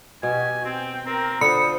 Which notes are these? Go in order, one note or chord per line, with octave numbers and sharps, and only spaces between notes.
B2 F#4 G4 G#5
C4 G5
C4 A#4
D3 F4 C5 B5 D#6 C#7